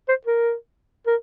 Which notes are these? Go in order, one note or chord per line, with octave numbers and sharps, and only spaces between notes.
C5
A#4
A#4